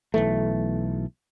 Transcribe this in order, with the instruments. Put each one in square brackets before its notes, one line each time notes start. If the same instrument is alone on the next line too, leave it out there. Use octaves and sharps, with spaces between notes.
[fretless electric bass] B1 E3 A3